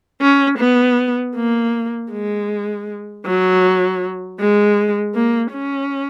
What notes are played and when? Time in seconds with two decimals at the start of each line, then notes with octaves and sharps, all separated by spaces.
0.21 C#4
0.59 B3
1.36 A#3
2.12 G#3
3.25 F#3
4.39 G#3
5.15 A#3
5.53 C#4